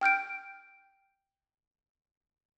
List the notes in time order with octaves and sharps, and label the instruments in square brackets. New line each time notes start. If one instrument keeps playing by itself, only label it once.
[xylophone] G5 F6 G6 D7